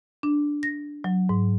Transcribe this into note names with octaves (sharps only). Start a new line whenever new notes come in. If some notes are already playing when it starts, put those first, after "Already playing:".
D4
A#6
F#3
G#2